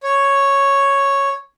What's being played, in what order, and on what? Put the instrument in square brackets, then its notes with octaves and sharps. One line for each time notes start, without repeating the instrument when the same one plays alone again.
[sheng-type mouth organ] C#5